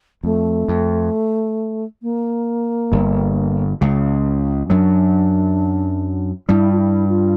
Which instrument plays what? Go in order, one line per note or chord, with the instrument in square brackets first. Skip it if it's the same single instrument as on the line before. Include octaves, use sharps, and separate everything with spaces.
[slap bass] F2 [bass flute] A3
[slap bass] F2
[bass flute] A#3
[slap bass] G1 G2
C#2 C#3
[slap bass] F#2 F#3 [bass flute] D4
[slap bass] G2 G3 [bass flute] E4
[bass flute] F4
E4
F4